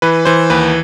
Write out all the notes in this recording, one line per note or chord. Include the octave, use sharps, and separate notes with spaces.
E3 B4
E3 C5
D#2 B4